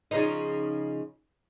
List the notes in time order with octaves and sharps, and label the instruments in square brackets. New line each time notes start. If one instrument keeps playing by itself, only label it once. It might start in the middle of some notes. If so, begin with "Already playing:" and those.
[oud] C#3 F3 D#4